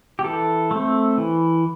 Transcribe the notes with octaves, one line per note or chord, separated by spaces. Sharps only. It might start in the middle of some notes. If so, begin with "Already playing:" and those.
G4
E3 A4
A3 C4
E3